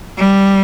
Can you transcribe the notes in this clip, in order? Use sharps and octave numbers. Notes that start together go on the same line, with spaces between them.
G3